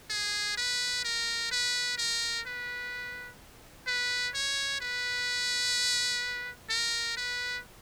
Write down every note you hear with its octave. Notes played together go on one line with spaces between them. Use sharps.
G#4
B4
A#4
B4
A#4
B4
B4
C#5
B4
A#4
B4